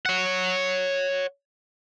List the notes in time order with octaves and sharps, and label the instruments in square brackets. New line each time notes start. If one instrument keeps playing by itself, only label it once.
[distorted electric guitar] C#5 F#5